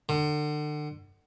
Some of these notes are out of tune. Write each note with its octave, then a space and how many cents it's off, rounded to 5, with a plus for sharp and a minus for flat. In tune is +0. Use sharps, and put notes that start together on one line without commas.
D3 +35